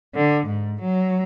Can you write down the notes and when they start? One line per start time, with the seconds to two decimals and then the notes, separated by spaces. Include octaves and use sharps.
0.15 D3
0.46 G#2
0.82 F#3